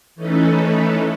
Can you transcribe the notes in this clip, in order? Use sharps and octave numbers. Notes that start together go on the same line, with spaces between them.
E3 A3 C#4 D#4 A4 B4